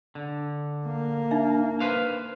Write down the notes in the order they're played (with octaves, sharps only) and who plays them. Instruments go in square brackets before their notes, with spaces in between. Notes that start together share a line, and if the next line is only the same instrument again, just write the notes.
[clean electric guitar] D3
[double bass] A#3
[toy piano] D4 D#4 E5
[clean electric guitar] B4 C5 F5